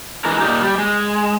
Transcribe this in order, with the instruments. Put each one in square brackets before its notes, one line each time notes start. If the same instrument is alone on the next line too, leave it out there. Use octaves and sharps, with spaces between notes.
[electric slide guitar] E3 G#3 A#4
A#2 D#4 G4
G3
G#3